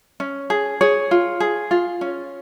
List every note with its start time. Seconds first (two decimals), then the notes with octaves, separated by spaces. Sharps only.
0.20 C#4
0.50 G#4
0.81 G#4 C#5
1.11 F4
1.40 G#4
1.71 F4
2.01 C#4